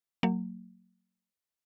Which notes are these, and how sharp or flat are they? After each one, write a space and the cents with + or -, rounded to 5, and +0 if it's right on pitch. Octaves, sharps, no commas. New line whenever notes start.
F#3 +0 A#3 -30